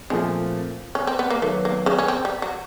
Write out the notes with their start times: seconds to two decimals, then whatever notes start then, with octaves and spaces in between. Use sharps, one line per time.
0.10 A#2 F3 G#3 A3 C4
0.95 C#4
1.07 C4
1.19 B3
1.30 A#3
1.42 D#3 F#3 A3 B3
1.65 A#3
1.86 C#3 C#4
1.98 C#4
2.08 C4
2.25 G3
2.42 F#3